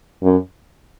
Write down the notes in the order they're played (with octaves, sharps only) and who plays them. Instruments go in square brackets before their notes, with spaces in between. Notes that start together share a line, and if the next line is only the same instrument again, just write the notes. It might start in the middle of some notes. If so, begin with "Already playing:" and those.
[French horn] F#2